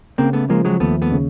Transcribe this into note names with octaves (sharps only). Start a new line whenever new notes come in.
C#3 A#3 C4
A3 B3
F3 G#3 A#3
F#3 G#3
D#2 A3 B3
A3 B3
C#3